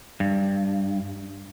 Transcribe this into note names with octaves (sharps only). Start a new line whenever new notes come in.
G2